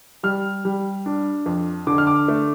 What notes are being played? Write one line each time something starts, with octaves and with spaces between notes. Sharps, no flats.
G3 F6
G3
D4
F2
D3 D6
F6
D6
A3